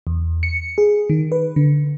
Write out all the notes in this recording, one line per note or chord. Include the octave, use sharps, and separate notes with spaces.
E2
C#7
G#4
D#3
B4
D3